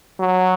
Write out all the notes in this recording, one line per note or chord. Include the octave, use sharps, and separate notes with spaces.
F#3